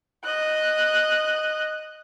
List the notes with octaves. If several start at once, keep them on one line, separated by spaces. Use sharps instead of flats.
D#5 F#6